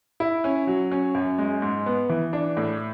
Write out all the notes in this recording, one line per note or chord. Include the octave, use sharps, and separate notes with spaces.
E4
C#4
F#3
C#4
F#2
G#3
G#2
B3
E3
D4
A2